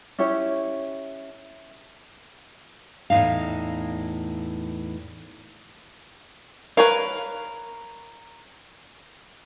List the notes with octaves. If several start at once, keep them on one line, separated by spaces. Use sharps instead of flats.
C#4 E4 G4 C#5
E2 A2 F3 D#4 F5
A#4 B4 C#5 F5